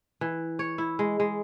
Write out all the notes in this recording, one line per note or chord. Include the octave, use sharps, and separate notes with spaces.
E3
C#5
E4
G#3
G#3